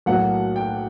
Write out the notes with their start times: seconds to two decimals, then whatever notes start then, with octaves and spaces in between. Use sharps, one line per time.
0.06 B1 A2 F#3 A#3 F#5
0.56 G5